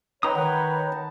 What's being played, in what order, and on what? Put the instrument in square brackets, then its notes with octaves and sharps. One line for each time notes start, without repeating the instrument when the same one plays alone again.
[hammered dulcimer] D#4 B5 [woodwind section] B4 C#5 [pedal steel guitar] G5 A#5 D#6
[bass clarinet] D#3 [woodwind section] B4 C#5 [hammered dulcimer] F#5
[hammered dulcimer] A5